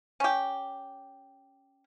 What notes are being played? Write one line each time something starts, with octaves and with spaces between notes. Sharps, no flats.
C#4 G4